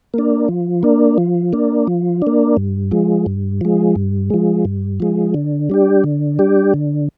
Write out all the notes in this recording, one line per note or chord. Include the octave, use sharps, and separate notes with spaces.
A#3 D4
F3
A#3 D4
F3
A#3 D4
F3
A#3 D4
G2
F3 G#3
G2
F3 G#3
G2
F3 G#3
G2
F3 G#3
D3
G3 D4 G4
D3
G3 D4 G4
D3